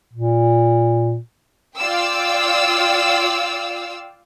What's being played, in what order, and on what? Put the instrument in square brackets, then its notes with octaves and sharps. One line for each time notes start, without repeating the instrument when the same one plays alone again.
[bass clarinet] A#2
[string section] F4 D5 F5 G5 E6